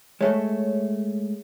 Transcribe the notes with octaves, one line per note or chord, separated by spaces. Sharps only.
G#3 A3 C#5 E5